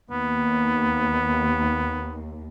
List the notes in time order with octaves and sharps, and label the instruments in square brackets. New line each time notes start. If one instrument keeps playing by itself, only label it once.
[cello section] D#2 [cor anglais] B3